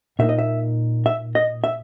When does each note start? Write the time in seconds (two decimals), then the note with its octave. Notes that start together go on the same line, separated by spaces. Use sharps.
0.19 A#2 A#3 D#4 E5
0.29 D#5
0.39 E5
1.06 E5
1.35 D#5
1.64 E5